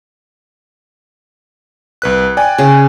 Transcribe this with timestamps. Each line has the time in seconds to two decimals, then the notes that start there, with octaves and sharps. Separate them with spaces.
2.02 C2 B4 F#6
2.37 D5 G5 G#5
2.58 C#3